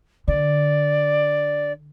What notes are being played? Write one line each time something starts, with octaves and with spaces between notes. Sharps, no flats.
D3 D5